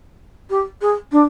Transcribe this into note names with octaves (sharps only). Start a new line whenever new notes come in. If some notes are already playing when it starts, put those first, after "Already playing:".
G4
G#4
D4